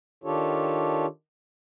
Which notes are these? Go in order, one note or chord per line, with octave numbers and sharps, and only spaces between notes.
D#3 D4 F4 G4 A4 C#5